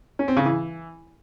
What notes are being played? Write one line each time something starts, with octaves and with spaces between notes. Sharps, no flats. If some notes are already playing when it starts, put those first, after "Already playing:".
C#4
C4
C#3
E3